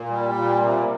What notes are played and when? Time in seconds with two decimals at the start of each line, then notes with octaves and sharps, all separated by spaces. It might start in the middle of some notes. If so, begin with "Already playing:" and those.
Already playing: A#2
0.09 G3
0.34 A#2
0.60 C3